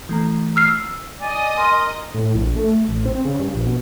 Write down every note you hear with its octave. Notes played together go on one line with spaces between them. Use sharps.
E3 A3 A#5
E6 F6 C7
E6
D5 D#5 G#5 D#6
A#4 C6
A2
A#1
A3
A1
C4
C#3
G2
A#1
B2